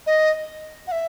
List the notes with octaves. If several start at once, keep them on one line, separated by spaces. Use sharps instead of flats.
D#5
F#5
E5